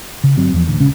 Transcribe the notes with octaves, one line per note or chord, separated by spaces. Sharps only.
C#3
G1 F#3 C4
E2 F3
A1 D2
D#1 C#2 C#3 C#4